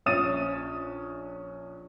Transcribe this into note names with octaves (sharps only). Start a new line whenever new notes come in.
A#1 C#4 D#6 A6 D#7